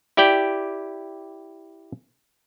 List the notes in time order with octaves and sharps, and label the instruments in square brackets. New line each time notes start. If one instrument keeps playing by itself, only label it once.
[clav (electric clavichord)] E4 G4 D5 G5